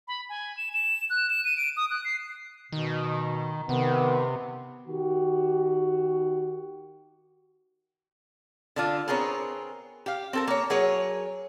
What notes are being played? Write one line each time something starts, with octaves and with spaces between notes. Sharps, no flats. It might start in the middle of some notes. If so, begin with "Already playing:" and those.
B5
G#5
E7
E7
F#6
E7
D#7
D7
D#6
F#6
C7
B2 D#3
C3 D#3 B3
D#3 F#4 G4
D3 D4 F4
B3 C4 G#4 A#4 C#5
G4 F5
C4 A4 A#4
A#3 C#5
F#3 G#4 A#4 C#5